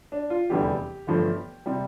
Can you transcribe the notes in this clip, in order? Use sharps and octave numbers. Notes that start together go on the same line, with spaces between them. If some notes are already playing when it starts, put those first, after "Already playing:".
D4
F4
F1 E2 D3 G3 G4
G1 G2 F3 A3
C3 G3